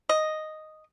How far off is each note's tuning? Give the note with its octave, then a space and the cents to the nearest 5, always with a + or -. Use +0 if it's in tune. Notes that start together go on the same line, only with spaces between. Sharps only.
D#5 +0